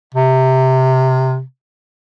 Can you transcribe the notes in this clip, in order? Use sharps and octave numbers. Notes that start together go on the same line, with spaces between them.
C3